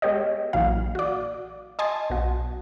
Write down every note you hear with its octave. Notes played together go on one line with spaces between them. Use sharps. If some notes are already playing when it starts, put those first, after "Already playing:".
G#3 B3 G4 C#5 D#5
A#1 A#2 E3 F#3 F5
F#4 D5
D#5 G#5 A5 C6
B1 F#4